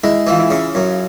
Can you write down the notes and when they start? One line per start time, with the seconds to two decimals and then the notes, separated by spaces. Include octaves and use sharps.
0.03 G#3 E4
0.27 E3 F4
0.39 E4
0.50 C#3
0.75 F#2